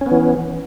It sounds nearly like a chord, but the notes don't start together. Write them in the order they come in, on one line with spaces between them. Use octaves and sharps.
C#4 B3 E3